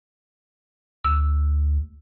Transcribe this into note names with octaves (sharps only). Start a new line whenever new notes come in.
D2 E6